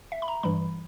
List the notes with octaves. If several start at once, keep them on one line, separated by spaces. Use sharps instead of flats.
E5
B5
A#5
G2 E3 G3 B5